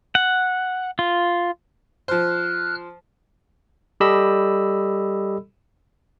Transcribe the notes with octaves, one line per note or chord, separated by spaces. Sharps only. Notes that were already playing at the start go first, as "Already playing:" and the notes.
F#5
F4
F3 C5 F6 F#6
G3 G4 A4 D#5 B5 E6